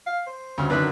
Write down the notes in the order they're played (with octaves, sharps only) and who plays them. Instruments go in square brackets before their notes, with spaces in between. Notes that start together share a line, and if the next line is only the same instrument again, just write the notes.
[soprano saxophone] F5
C5
[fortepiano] D2 G2 C#3
[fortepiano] F#2 D3 D#3 [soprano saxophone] B4